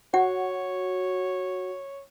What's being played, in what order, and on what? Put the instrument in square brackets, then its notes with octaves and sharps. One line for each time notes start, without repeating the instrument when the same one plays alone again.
[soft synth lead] F#4 [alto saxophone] C#5 [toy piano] F#5